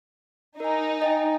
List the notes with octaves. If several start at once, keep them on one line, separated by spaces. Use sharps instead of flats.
D#4 A#4 G#5
D#5 G5 G#5